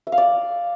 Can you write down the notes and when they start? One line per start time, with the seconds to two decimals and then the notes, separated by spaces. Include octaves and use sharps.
0.07 E5
0.12 F5
0.18 D5